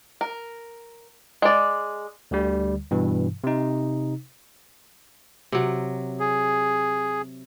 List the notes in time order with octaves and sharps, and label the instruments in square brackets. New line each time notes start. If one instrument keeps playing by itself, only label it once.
[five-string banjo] A#4
G#3 D5
[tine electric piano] D2 D3 G3
G2 B2 E3
C3 D#4
[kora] C3 F#3
[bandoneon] G#4